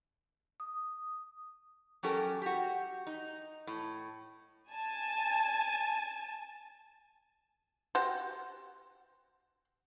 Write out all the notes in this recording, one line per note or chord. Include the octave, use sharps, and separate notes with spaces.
D#6
F#3 C#4 G4 A4 A#4
F#4 G4
D#4
A2
G#5 A5
F#4 G4 C5